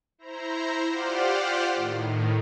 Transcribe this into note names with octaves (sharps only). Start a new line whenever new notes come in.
E4 C5 A#5
F4 G4 C5 D5 F#5 F6
A2 D#3